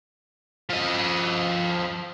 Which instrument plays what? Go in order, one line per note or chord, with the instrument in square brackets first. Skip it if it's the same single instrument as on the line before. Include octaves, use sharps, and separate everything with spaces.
[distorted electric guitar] F3 D#5